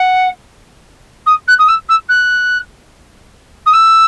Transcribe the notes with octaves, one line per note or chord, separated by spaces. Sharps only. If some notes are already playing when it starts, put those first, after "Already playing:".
Already playing: F#5
D#6
F#6
D#6
E6
E6
F#6
D#6
E6